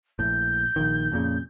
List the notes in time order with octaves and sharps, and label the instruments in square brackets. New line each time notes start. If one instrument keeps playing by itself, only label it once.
[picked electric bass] A#1 A2 [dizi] G6
[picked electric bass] A#1 D#3
F2 A#2 C#3